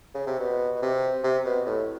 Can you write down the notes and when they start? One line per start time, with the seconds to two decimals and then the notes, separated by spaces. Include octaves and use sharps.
0.15 C#3
0.27 C3
0.40 B2
0.76 B2
0.82 C3
1.24 C3
1.45 B2
1.66 A2